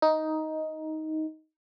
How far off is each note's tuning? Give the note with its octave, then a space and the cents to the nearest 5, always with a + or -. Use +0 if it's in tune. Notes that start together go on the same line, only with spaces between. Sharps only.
D#4 +10